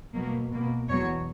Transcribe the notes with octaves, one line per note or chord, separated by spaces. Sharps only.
B2 F#3 A#3
B2 A#3
E2 B2 F#3 C#5